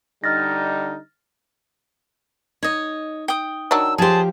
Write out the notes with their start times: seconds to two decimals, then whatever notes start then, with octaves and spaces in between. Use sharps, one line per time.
0.24 D3 G3 D#4 F6 A6 A#6
2.63 D#4 C#5 D#5
3.28 G5 D#6
3.71 D#3 F#3 D4 E6
3.98 F3 G4 G#4 C5 A5